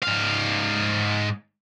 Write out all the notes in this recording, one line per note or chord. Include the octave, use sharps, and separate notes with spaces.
G#2 F5